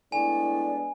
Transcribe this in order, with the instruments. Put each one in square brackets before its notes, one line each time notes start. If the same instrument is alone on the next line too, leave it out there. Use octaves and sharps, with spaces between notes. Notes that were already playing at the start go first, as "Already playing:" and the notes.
[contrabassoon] A2 [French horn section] G#3 B3 D4 [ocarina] D5 [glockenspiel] G#5